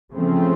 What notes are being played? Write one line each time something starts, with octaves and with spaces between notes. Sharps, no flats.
C#3 F3 A3 C4